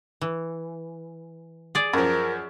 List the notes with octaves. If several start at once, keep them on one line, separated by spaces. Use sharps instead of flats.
E3
G#4 D5
F#2 F3 A#4